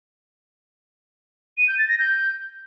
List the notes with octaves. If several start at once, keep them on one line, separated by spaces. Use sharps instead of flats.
D#7
G6
A6
A#6
G6